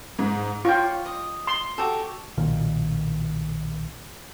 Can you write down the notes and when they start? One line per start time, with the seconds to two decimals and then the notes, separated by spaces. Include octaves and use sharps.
0.19 G#2
0.65 F4 C#5 G5 C#6 D6
1.05 D#5
1.47 C6
1.78 F#4 G4 A4
2.37 B1 A#2 D#3